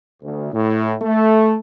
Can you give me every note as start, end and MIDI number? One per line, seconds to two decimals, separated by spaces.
0.21 0.48 38
0.53 0.94 45
1.01 1.56 57